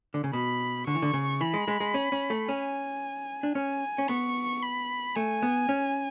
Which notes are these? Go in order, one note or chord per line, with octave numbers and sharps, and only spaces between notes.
D3
C#3
B2 B5
D3 C#6
E3
D3
C#3
E3 B5
G#3
G#3
G#3
C#4
C#4
A3
C#4 G#5
D4
C#4 G#5
C#4
B3 C#6
B5
A3 G#5
B3
C#4